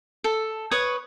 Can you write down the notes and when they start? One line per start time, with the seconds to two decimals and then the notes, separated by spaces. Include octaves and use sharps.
0.24 A4
0.71 B4 C#5 C#6 D#6